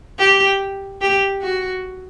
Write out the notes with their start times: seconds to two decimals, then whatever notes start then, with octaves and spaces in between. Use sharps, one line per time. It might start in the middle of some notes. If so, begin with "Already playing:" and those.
0.19 G4
1.02 G4
1.42 F#4